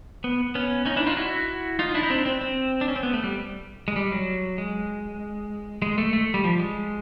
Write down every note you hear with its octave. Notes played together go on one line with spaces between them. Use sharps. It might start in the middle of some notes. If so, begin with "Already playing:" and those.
B3
B3 C#4
C#4 D#4
D4 E4
D#4 F4
E4 F#4
D#4 F4
D4 E4
D#4
C4 D4
C4
C4
D4
C#4
C4
B3
A3
G3
G#3
G3
F#3
G#3
G#3
A3
A3
G3
F3
G#3